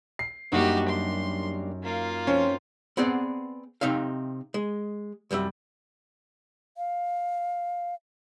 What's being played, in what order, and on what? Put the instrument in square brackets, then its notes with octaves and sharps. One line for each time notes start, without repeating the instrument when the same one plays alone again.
[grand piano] C7
[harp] F#2 D#4 [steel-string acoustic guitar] G3 A#3 D4 [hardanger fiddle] F#4 G4
[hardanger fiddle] C6
A#3 F4
[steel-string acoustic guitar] F3 [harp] C4 [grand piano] C#4
[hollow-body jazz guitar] B3 C4 G#4 D5 F#5
C3 C4 D#4 E5 F5
G#3
C2 F#2 G3 E5
[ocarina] F5